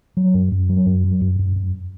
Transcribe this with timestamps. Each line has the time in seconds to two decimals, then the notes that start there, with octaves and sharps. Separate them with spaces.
0.17 F#3
0.34 F#2
0.52 F#2
0.69 F#3
0.86 F#2
1.04 F#3
1.21 F#2
1.39 F#2
1.56 F#2